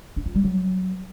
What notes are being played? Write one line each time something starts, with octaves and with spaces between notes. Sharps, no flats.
D4
F4
G3
F#3